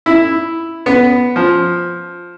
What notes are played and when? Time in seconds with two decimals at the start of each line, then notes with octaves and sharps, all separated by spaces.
0.06 E4
0.86 B3
1.36 F3